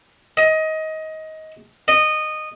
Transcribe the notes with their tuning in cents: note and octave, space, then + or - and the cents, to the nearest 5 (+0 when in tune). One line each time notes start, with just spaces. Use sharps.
D#5 +20
D#5 -15